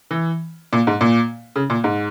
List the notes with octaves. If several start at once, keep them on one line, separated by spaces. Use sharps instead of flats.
E3
A#2
G#2
A#2
C#3
A#2
G#2